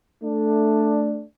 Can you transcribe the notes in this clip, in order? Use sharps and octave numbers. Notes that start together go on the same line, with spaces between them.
A3 D4